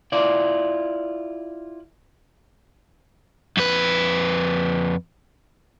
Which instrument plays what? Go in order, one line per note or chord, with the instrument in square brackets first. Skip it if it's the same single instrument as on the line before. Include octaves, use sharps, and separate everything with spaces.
[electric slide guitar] E4 F4 D5
[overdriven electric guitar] F2 B4